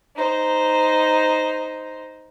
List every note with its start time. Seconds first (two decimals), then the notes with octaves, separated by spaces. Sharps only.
0.15 D#4 C5